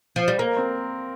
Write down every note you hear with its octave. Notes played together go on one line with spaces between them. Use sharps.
F3
G3
A#3 A#4
C4